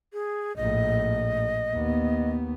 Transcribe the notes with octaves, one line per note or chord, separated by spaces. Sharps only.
G#4
A#1 A2 D#5
D#2 B3